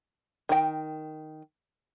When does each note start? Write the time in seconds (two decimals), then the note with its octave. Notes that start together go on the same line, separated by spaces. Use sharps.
0.49 D#3 G5